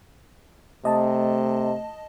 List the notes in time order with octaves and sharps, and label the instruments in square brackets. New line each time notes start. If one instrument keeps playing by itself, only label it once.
[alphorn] C3 [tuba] A3 [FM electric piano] D#5 A5